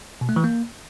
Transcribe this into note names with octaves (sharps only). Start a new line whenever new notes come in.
B2
A3
E3
A#3